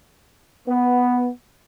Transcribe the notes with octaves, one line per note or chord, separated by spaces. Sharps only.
B3